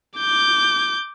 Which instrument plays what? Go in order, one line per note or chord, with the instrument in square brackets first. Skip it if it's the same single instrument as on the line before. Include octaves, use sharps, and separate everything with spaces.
[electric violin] D6 G6